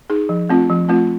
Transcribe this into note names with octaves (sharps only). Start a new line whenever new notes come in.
D#4 G#4
F3
A3 C4 F4
F3
A3 C4 F4